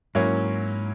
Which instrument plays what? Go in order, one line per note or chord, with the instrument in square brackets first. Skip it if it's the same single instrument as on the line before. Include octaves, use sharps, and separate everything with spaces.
[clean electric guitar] G#2 [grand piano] F#3 A#3 C#4 E4